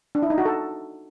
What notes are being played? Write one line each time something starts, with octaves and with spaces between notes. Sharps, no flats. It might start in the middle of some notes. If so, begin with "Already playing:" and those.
D4
E4
D#4
F#4
A4